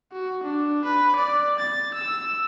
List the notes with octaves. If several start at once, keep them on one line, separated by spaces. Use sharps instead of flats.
F#4
D4
B4
D5
A6
E6